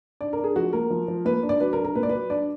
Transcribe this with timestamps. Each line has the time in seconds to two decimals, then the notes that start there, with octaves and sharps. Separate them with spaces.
0.21 D4 D5
0.33 A#4
0.39 D4
0.44 G#4
0.56 F3 F#4
0.73 A#3 A#4
0.90 F3
1.08 F3
1.25 A#3 B4
1.43 D4
1.49 D5
1.60 F#3 B4
1.73 A#4
1.78 D4
1.85 A#4
1.95 A#2 B4
2.03 D5
2.09 F#3 B4
2.30 D4 D5